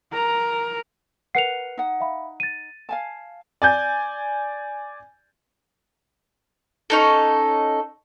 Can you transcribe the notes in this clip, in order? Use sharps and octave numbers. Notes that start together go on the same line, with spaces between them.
A#4 A#5
A#4 B4 F#5 C7 C#7 F7
D#4 F#5
E5 F5 B5
A6 D#7
F5 G#5 A5
D5 G#5 G6
C#4 D#4 A4